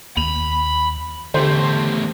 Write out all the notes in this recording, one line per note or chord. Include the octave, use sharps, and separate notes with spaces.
D#2 B5 F7
E2 D3 A3 G4 C5